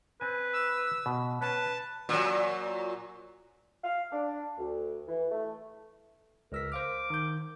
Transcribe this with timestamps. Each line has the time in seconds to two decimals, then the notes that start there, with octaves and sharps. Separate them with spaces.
0.21 C4 B4 G#5
0.53 E6
1.06 B2
1.42 C#4 B4 A5
2.09 A#2 F#3
3.84 F5
4.12 D4
4.59 D2
5.08 E3
5.31 A3
6.52 C#2 A#4 E6 B6
6.72 C5 F5 D6 F6
7.10 D#3 G6